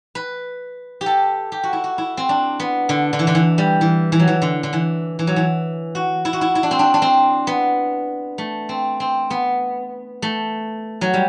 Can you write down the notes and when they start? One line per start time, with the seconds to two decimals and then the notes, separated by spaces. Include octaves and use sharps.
0.15 B4
1.01 G4
1.06 A4
1.52 G4
1.63 F#4
1.73 E4
1.84 F#4
1.98 E4
2.17 C4
2.29 D4
2.60 B3
2.89 D3
3.13 D3
3.19 E3
3.27 D3
3.35 E3
3.58 G3
3.81 E3
4.12 E3
4.19 F#3
4.28 E3
4.42 D3
4.63 D3
4.73 E3
5.19 E3
5.27 F#3
5.36 E3
5.95 F#4
6.25 E4
6.33 F#4
6.41 E4
6.55 E4
6.63 D4
6.71 C4
6.79 D4
6.94 D4
7.02 C4
7.47 B3
8.38 A3
8.69 C4
9.00 C4
9.30 B3
10.22 A3
11.01 F#3
11.14 G3